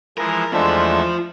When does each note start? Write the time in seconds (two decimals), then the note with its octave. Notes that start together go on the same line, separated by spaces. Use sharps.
0.18 E3 F3 G#3 A#4
0.53 E2 G#3 A3 D4 F4 C5 E5